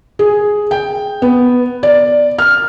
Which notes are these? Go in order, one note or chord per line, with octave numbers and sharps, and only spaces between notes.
G#4
G5
B3
D5
F6